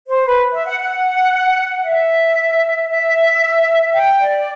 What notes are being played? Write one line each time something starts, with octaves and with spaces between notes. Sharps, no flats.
C5
B4
E5
F#5
F#5
E5
E5
G5
D5